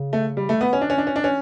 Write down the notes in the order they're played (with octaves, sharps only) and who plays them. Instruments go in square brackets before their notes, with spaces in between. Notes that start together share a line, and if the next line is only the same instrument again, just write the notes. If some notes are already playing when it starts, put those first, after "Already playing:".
Already playing: [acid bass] C#3
[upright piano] A3
G3
A3
B3
C#4
D4
C#4
D4
C#4
D4
C#4